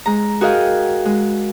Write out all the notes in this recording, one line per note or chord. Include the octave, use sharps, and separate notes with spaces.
G#3 A#5
F#4 G#4 A#4 D#5 F5 G5
G#3